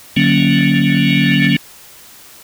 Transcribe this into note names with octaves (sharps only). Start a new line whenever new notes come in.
D3 F#3 A#3 C#4